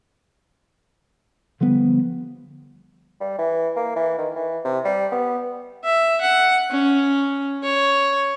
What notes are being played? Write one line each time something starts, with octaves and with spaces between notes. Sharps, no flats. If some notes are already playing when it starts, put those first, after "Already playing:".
D3 F3 G3 B3
G3
E3
A#3
E3
D#3
E3
C3
G3
B3
E5
F#5
C#4
C#5